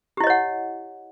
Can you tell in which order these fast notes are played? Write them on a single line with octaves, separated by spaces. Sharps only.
G4 E4 D#5 C#5 F#5